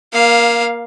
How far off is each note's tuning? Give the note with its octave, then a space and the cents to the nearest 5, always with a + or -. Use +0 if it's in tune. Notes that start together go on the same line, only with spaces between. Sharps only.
A#3 +15 F5 +0